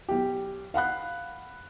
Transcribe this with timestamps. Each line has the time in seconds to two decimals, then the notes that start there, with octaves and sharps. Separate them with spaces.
0.09 B1 G4
0.74 F5 F#5 B5 F#6